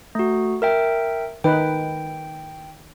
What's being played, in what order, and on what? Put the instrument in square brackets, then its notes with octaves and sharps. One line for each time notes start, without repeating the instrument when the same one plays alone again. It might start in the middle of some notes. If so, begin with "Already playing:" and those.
[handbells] A3 F#4
A#4 E5 G5
[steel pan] D#3 D#4 B4 [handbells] G5